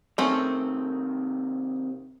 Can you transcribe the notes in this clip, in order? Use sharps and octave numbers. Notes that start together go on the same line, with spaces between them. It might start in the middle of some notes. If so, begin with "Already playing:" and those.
C3 D#3 A3 C4 C#4